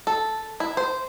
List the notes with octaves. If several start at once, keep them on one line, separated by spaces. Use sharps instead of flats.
A4
E4
C5